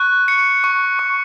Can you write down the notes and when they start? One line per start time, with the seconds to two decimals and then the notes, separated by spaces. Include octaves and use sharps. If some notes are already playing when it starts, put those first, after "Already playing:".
Already playing: C#6 F#6
0.28 C#7
0.64 C#6
0.99 C#6